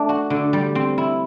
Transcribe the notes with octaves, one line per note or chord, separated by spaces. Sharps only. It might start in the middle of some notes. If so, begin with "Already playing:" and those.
Already playing: A3 D4
F#4
D3
G3
C4
E4